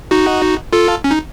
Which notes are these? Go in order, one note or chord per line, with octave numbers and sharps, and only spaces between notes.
D#4 F#4
F4 A4
C#4
D#4